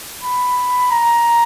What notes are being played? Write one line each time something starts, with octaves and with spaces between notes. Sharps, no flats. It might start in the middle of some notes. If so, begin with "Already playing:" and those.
B5
A#5